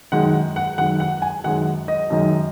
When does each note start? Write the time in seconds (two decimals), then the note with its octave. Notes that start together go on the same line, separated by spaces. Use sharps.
0.12 F#2 D#3 G#3 F#5
0.56 F#5
0.78 F#2 D#3 G#3 F#5
1.00 F#5
1.22 G#5
1.44 F#2 D#3 G#3 F#5
1.88 D#5
2.10 F#2 D#3 G#3